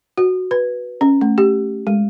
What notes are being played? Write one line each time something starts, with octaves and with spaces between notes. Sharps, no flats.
F#4
B4
C#4
A3
G4
G#3